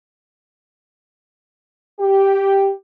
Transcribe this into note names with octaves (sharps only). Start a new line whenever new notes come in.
G4